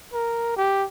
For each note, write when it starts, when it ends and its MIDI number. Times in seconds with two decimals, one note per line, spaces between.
0.13 0.53 70
0.56 0.85 67